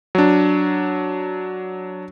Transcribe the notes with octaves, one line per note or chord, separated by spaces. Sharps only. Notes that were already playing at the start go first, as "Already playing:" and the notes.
F#3 D4